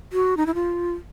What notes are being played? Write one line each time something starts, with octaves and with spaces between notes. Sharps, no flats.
F#4
D#4
E4
F4